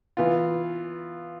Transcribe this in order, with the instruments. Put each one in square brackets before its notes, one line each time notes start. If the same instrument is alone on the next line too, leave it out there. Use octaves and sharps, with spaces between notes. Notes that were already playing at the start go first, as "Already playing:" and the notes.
[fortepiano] E3 B3 F4